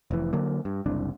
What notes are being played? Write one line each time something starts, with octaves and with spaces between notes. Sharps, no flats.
F1 E3
D3 F#3 A#3
G2
F#1 C2 D4